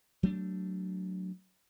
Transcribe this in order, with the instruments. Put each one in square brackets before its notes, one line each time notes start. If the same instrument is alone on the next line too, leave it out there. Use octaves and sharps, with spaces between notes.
[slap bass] F#3 A3 D4